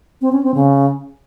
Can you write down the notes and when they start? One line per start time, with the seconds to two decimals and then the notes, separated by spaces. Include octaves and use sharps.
0.21 C4
0.32 C#4
0.43 C4
0.54 C#3